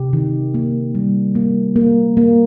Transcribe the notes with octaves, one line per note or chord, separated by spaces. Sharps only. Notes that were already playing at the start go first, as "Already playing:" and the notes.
Already playing: C3 G4
D#3
A#3
G3
A#3
A#3
A#3